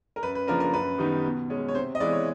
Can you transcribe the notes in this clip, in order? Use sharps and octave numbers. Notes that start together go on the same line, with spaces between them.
A#4
F#2 B4
B4
C#3 F3 A#3 D4 A#4
A#4
F#2 B4
D#3 G3 B3 D#4
B2
G#3 C#4
C#5
C3 C5
D#5
E3 G#3 B3 E4 D5
C#5